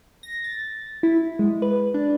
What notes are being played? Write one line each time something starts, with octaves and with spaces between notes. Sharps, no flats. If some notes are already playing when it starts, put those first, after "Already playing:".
A#6
A6
E4
G#3
B4
D4